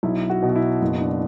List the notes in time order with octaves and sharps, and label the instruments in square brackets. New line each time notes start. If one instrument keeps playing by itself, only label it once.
[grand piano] B1 E4
F#4
B2
F#4
E4
F#1
D4